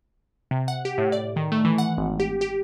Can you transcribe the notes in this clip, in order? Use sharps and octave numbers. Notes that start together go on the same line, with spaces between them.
C3
F#5
G4
A2
D5
D#3
A3
E3
F#5
G#1
G4
G4